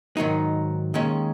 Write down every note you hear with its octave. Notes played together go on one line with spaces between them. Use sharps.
G#2 D#3 F#3 D#4
D#2 D#3 G#3 C#4